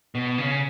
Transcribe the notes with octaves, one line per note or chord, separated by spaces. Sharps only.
B2
C#3